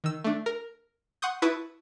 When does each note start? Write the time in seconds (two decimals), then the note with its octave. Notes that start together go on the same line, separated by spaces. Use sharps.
0.04 D#3 E6
0.24 A3 D4
0.46 A#4
1.22 F#5 C6 C#6 D#6 G6
1.42 E4 B4 E5 A5 C#6 D#6